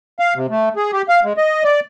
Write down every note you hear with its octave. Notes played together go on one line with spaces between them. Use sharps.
F5
C3
A3
G#4
G4
F5
G#3
D#5
D5